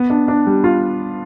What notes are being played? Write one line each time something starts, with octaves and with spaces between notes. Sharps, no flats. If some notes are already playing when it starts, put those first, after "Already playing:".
Already playing: B3
D4
D4
G3
F4